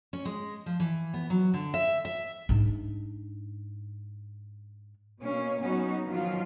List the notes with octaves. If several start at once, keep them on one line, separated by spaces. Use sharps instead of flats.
C#4
G#3
F3
E3
B3
F#3
D3
E5
E5
G#2 D4
B2 A#3 C#4
F#3 B3 C#4 D#4 F#4
D#3 F3 F#3 F4